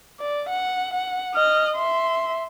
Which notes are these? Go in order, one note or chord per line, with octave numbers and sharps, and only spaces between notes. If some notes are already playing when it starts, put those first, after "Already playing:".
D5
F#5
F#5
D#5 F6
E5 C6